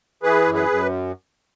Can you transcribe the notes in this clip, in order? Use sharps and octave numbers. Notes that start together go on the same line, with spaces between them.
E3 G#4 B4
F#2
G#4 B4
F#2